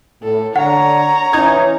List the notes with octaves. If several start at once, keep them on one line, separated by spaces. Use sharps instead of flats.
A2 A4
D3 C#5 F#5 A#5
E3 C#4 D#4 G#6